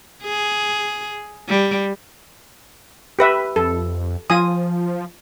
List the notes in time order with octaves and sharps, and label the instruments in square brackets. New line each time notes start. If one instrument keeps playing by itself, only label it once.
[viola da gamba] G#4
G3
[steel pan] G4 B4 E5
[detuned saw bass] F2 [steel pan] A4
[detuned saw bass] F3 [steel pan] F4 G#5 D#6